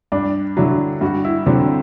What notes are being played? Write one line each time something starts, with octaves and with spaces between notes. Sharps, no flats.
G2 D4
D3 F#3 E4
G2 F#4
E4
D3 F#3 C4